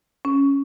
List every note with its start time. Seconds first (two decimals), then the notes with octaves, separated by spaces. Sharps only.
0.25 C#4